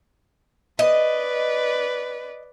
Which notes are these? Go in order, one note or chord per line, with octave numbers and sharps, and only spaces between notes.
B4 D5 D#5